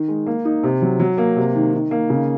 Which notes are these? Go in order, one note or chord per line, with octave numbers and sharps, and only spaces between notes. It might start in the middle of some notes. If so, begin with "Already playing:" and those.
Already playing: D#3
G#3
A#3
D#4
C3
F#3
F#3
A#3
C3
D#3
D#3
A#3
C#3